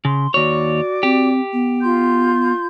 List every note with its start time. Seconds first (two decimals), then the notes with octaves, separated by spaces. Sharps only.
0.05 C#3 C6
0.34 D#2 F#4 C#5 D5 D6
1.03 C4 G4
1.53 B3
1.82 F4 C6 G6